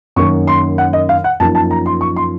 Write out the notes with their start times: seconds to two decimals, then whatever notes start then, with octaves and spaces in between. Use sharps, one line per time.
0.16 F#2 D#3 A#3 C#6
0.47 C6
0.78 F#5
0.93 D#5
1.09 F5
1.24 F#5
1.40 F#2 F3 A#3 D#4 A5
1.55 A5
1.71 A#5
1.86 C6
2.01 C#6
2.16 C6